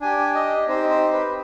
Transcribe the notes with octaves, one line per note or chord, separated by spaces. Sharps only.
D4 G4 G#5
D#5
C4 D#4 G4 C5
C5
B4